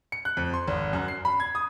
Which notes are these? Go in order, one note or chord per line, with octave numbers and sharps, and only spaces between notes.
C#7
F#6
F2
C6
G#1
F#2
C7
B5
G#6
D#6